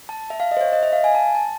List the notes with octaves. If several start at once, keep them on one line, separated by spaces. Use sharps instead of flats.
A5
E5
F5
D#5
C5
C#5
D#5
E5
F5
G#5
A5
A5